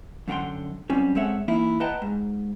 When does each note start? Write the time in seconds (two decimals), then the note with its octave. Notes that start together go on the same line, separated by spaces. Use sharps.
0.28 F#2 D3 F#5 G5 C6
0.90 F#3 G3 C4 C#4 G4
1.15 G#3 C4 A4 C#5 E5 F#5
1.48 E3 A#3 D#4 E4
1.80 B4 D#5 F#5 G5 A5 A#5
2.02 G#2